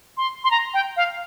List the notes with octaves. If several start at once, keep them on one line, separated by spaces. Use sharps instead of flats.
C6
C6
A#5
G5
F5